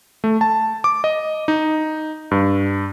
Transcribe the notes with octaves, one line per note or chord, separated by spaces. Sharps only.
A3
A5
D6
D#5
D#4
G2